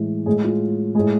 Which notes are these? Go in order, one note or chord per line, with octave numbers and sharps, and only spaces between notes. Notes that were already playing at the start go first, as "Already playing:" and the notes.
Already playing: A2 E3 G#3
A2 G#3 G#4
F4
A2 G#3 G#4